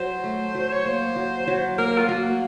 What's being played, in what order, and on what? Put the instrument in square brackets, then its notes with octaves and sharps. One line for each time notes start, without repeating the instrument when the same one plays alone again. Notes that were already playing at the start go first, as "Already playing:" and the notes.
Already playing: [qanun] F#3 [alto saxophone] C5
[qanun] A3
F#3
[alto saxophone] C#5
[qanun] A#3 [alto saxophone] C5
[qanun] F#3
F#3
[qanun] A#3 [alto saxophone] A#4
[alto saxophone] F4
[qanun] A#3 [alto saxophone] F#4